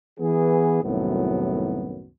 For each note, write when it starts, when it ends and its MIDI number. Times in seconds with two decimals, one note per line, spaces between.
0.19 0.81 52
0.19 0.81 59
0.19 0.81 68
0.83 2.09 36
0.83 2.09 42
0.83 2.09 45
0.83 2.09 51
0.83 2.09 54
0.83 2.09 59